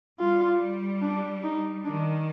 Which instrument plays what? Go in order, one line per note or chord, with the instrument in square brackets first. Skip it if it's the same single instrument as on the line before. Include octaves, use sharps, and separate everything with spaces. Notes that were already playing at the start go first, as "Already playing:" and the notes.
[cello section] G3 [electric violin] F4
[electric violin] D4
D#4
[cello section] D#3 [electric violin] D4